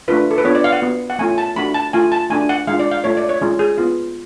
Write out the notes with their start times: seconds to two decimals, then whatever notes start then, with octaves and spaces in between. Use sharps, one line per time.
0.08 A3 D4 F4 B4
0.31 A4
0.38 B4
0.45 B3 D4 F4 C#5
0.55 D5
0.64 F5
0.73 F#5
0.82 B3 F#4
1.10 F#5
1.19 A3 C#4 F4 G#5
1.38 A5
1.56 A3 D4 F#4 B5
1.74 A5
1.93 A3 F4 G#5
2.12 A5
2.30 A3 D4 F#4 G#5
2.49 F#5
2.67 G#3 D4 F4 F5
2.80 D5
2.91 F5
3.04 A3 F4 C#5
3.17 D5
3.29 C#5
3.41 G#3 C#4 F4
3.59 G#4
3.78 B3 F4